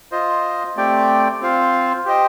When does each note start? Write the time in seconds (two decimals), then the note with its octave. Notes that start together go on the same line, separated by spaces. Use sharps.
0.12 F4 C5 D#5
0.76 A3 C4 G4 D5 G5
1.41 C4 F4 C5 F5
2.06 G4 C5 D#5 G5